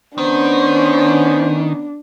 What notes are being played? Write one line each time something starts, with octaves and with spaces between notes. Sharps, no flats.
D#3 B3 C#4 D4 C5